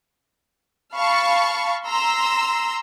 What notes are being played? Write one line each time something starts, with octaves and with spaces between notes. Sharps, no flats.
F5 A5 B5 C#6
A#5 C6 E6